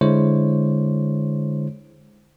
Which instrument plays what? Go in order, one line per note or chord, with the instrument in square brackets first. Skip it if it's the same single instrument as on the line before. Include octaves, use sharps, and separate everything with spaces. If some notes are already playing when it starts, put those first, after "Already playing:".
[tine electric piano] D3 G#3 E4 C5 C#5